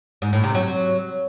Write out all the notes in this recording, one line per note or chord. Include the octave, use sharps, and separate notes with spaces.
G#2
A2
C3
F#3